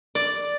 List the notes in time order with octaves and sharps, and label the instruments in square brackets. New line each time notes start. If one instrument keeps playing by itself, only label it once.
[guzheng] D5